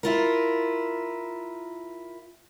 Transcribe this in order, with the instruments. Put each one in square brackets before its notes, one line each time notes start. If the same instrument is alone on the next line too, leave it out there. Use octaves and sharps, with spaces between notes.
[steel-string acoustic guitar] E4 F4 A#4